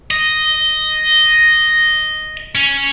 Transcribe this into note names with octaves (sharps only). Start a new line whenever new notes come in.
D#5
C#4